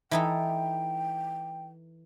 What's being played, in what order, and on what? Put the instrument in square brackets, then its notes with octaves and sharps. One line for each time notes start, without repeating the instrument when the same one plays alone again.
[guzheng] E3 D#4 A4 [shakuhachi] G5